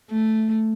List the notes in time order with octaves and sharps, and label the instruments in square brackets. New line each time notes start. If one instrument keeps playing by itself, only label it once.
[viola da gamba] A3